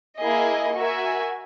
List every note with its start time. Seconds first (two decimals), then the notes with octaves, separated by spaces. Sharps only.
0.21 A#3 E4 G#4 D#5
0.77 F#4 A#4 E5 G#5